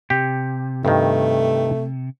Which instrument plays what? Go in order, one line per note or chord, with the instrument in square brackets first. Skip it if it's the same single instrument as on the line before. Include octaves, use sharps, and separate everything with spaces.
[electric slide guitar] C3 [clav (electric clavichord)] G4
[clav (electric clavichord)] G2 D#3 [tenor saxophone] A3